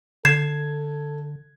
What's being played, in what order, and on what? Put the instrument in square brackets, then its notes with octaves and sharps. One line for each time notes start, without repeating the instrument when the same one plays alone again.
[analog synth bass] D3 [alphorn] A4 [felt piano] G#6 [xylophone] C7 E7